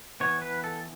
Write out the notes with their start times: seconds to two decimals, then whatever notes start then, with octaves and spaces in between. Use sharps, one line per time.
0.20 E3 B3 C#5
0.42 B4
0.64 A4